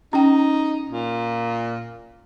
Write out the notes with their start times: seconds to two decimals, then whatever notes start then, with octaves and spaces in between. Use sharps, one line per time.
0.13 C#4 D#4 G5
0.90 A#2